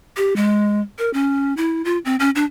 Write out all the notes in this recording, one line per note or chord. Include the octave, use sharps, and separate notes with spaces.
G4
G#3
A#4
C#4
E4
F4
C4
C#4
D4